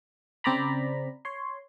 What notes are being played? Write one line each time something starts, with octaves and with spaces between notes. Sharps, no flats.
C#3 C4 C5 D5 A#5 B5
C#5 C6